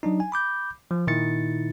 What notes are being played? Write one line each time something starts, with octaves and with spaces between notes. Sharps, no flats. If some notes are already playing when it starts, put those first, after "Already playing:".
F#3 D4 D#4
G#5
B5 D6 G6
F3
A#2 D#3 D#4 E4 A6 C#7